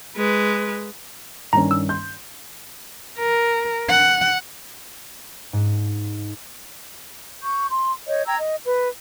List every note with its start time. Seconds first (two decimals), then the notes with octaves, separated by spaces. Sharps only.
0.16 G#3 B4
1.53 G2 D#3 C#4 A#5
1.71 E6
1.89 C6 G6
3.19 A#4
3.90 F#5
5.53 G#2
7.42 C#6 G6
7.69 C6
8.08 C#5 D#5 G6
8.26 G5 A#5 E6 G#6
8.38 D#5
8.66 B4